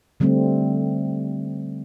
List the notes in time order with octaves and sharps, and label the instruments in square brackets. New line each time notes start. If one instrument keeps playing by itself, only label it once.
[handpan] D3 G3 A3 C4